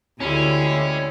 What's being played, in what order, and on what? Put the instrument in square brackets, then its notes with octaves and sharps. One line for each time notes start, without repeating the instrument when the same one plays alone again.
[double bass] D2 [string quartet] D3 G3 G#3 [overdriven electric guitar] C#4 [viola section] E4